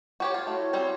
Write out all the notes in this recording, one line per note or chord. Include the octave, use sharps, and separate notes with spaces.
F#4 G4 C#5
F4
A3 E4 F#4 C#5
G3 C4 C#4